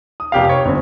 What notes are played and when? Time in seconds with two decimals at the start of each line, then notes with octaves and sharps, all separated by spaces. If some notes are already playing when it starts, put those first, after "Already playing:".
0.20 D#6
0.32 F1 G4 F5
0.49 C#5
0.65 G1 C4